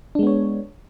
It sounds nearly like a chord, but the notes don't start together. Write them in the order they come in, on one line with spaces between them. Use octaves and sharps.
D4 G#3 B3 C#5